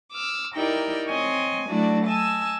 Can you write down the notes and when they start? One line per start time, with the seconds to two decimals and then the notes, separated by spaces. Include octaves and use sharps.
0.13 D6 E6 F6
0.54 D#4 E4 G4 A#4 D5 G5
1.08 C4 C#5 D#5 G#5
1.68 F#3 A3 D4 E4 F#4 D5
2.06 D#5 G#5 A5 E6